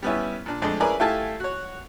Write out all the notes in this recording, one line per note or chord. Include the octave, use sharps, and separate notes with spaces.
G3 B3 C#4 E4
A#2 D4
F2 G#3 A3 D4
C#4 E4 G#4 A#4 B4 D5
A3 E4 F4 G4 G#5 A5
F#4 C#5